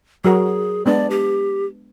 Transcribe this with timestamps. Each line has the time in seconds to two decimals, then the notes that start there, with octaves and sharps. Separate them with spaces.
0.25 F#3 F#4 G#4 A#4
0.86 G#3 B3 D4 D5
1.10 G4